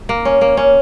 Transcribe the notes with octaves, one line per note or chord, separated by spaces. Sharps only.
A#3
C#4
A#3
C#4